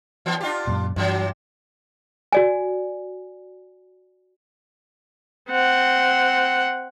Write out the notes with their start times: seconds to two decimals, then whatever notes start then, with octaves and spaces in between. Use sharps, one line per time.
0.26 E3 B3
0.41 D4 F4 G4
0.67 F#2 A#2
0.96 G2 C3 E3 F#3
2.32 F#4 D5 G#5
5.50 C4 F#5